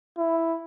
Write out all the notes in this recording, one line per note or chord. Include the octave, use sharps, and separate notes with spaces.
E4